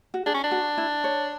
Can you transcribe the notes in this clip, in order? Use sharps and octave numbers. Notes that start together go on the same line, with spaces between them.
F#4
D4 G#4
C#4
D4
F#4
E4
C#5